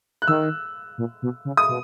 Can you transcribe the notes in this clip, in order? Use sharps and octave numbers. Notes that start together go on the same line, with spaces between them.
F#6
D#3 E6
A#2
B2
C#3
D#6
B2